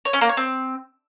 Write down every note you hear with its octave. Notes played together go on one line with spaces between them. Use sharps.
C#5
C#4
A#3
C#5
C4